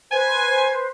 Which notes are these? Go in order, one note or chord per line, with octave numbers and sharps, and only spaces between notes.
B4 C5 G#5